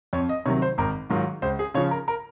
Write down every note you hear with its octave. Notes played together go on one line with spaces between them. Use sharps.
F2 C#5
D#5
C3 D#3 F#3 C#5
C5
G#1 A#4
G#2 D#3 F#3 F4
C#2 C5
G#4
C#3 F3 C#5
A#4
A#4